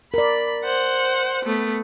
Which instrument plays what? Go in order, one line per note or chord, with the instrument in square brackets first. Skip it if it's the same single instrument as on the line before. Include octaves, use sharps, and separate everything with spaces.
[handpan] A#4 D5 [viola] B5
[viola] C5 F#5
A3 B3